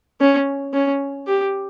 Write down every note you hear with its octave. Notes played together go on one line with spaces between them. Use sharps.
C#4
C#4
G4